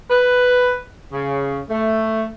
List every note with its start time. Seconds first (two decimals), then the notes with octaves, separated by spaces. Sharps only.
0.10 B4
1.13 C#3
1.70 A3